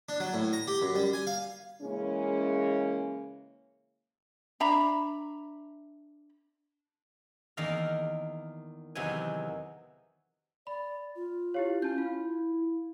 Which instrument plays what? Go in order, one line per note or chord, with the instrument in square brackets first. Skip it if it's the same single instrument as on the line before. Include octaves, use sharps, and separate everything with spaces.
[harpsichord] D4
F#3
A2
A#5
G4
F#2
G3
G#5
F5
[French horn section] C#3 E3 G#3 A#3 C#4
[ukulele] D4 E5 A#5 B5
[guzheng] E2 D#3 A#3 D5 F5 A#5
E2 C3 D#3 E3 F#3 G#5
[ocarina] D5 [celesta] B5
[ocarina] F4
[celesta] E4 G4 C#5 [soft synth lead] F5
[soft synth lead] C#4 [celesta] A5 G6
[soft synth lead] E4 [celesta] F5